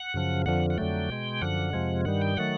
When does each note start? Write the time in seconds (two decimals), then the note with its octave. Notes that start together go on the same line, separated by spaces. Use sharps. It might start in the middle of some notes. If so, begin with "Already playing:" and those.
Already playing: F#5
0.14 F#2 C#3 F3
0.46 F2 D3 F3 F#5
0.70 F#5
0.78 F2 D3 F#3 A3 G5
1.09 B2 G#3
1.41 F#2 D3 F3 F#5
1.73 F2 C3 F3 G#3
2.05 G2 D#3 G3 F#5
2.21 G5
2.37 D#3 F#3 A3 F#5